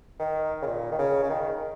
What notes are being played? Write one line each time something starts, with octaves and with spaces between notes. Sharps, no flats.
D#3
C#3
A#2
D#3
C#3
C#3
D#3